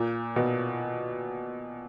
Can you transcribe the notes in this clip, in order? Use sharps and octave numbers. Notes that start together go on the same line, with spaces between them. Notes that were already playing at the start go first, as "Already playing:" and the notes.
Already playing: A#2
B2